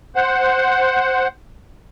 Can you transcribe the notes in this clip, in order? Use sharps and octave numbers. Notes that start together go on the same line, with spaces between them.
C5 F#5